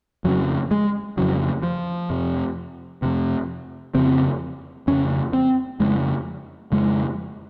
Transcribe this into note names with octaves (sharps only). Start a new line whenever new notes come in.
F2 C#3 F#3
G#3
F2 C#3 F#3
F3
F2 C3
F2 C3
F2 C#3 C4
F2 C#3 C#4
C4
F2 C#3 G#3
F2 C#3 G#3